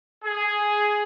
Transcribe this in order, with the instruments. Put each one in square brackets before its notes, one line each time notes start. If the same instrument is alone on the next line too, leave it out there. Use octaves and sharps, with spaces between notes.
[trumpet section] G#4